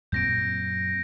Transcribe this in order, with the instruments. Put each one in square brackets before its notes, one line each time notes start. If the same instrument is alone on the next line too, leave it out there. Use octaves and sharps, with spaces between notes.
[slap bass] F#2 A#2 C4 [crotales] G6 A#6 D7